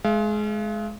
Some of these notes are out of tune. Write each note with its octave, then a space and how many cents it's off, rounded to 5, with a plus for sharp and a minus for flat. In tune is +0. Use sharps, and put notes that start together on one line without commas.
G#3 +25 F5 -40